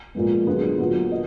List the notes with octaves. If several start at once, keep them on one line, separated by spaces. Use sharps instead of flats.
A#2 F3 G#3 B3
D3 F#3 B3 F4 G#4
A#2 F#3 B3
D#5